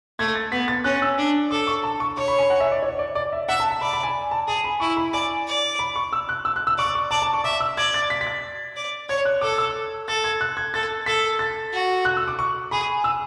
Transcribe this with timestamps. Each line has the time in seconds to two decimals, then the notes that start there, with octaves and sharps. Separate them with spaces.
0.19 A3 G#6
0.35 A6
0.52 B3 B6
0.68 A6
0.84 C#4 F#6
1.02 E6
1.18 D4
1.51 A4 D6
1.67 C#6
1.83 A5
2.00 C#6
2.17 C#5 C#6
2.28 B5
2.39 G#5
2.50 F#5
2.60 E5
2.72 D5
2.83 C#5
2.99 D5
3.15 D5
3.33 E5
3.49 E5 F#5
3.60 A5
3.71 A5
3.81 D5 B5
3.93 B5
4.03 G#5
4.31 A5
4.48 G#4 A5
4.64 B5
4.80 E4 C#6
4.97 B5
5.13 D5 G#5
5.47 D5
5.79 B5
5.96 C#6
6.13 E6
6.29 F#6
6.45 E6
6.56 F#6
6.67 E6
6.78 D5 C#6
6.95 C#6
7.11 D5 A5
7.22 A5
7.34 C#6
7.44 E5 D6
7.60 E6
7.77 D5 G#6
7.94 A6
8.10 B6
8.21 B6
8.27 A6
8.76 D5
9.09 C#5 G#6
9.25 F#6
9.41 A4 D6
9.58 E6
10.08 A4 A6
10.24 G#6
10.41 F#6
10.57 G#6
10.74 A4 A6
11.06 A4 B6
11.39 A6
11.73 F#4
12.05 F#6
12.17 E6
12.28 D6
12.39 C#6
12.71 G#4 B5
13.04 E6